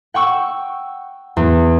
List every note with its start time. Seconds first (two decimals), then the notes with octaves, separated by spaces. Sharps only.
0.14 F#5 G5 C#6 E6
1.37 E2